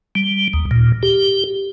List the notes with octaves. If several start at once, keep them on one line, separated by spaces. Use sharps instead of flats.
G3
D#2
A#2
G4